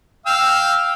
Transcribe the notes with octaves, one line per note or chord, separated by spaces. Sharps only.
F5 G5 E6